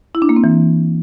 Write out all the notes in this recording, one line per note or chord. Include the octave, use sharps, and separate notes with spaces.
E4
D4
A#3
C4
E3